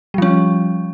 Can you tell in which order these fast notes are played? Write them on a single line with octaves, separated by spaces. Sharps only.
G3 F3 C#4